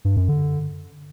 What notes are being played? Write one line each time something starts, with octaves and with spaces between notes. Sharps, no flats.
G2
F#2
D3